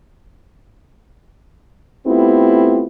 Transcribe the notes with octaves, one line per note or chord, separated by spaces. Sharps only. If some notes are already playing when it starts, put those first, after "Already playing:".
A3 B3 C4 E4 F4 G4